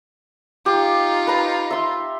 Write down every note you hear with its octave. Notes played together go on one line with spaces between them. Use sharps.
D#4 F4 G4
B4 A#5
E5 C6